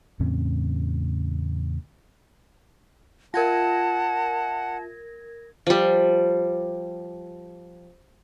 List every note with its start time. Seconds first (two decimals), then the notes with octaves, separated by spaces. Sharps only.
0.20 E2 A2 C#3 C4
3.34 F4 A#4 E5 F#5 A5 G#6 A#6
5.67 F3 G3